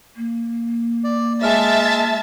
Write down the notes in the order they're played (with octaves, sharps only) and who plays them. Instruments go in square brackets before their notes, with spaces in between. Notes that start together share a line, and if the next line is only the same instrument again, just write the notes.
[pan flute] A#3
[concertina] D5
[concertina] G#3 F6 [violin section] E5 A5 A6